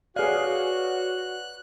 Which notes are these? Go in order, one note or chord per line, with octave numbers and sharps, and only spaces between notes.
F#4 G#4 B4 C#5 D5 F5 F#6